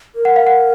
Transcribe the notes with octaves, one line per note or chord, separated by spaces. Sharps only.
A#4
F#5
F5
F#5